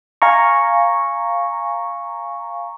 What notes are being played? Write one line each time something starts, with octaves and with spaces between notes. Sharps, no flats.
F5 G#5 A#5 C#6